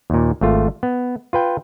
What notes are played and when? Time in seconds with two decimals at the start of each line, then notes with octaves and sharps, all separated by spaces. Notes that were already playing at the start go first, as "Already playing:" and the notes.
0.10 D#2 A#2
0.41 G#1 A3 F4
0.83 B3
1.33 F4 B4 G5